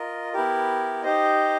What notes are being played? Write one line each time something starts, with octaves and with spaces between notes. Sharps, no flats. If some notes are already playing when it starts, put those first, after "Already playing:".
Already playing: F4 A#4 D#5
B3 E4 G4 A#4
D#4 G4 C5 D#5